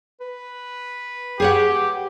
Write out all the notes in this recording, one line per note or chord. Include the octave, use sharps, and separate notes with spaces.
B4
G4 G#4 C#5 F#5